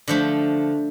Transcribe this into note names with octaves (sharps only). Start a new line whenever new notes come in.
D3 F3 A3